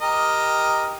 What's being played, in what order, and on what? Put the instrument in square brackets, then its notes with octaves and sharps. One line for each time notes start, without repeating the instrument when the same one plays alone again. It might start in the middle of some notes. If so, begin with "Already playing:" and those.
[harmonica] G4 A#4 D#5